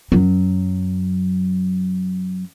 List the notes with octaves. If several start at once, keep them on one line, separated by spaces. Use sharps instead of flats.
F#2 F#3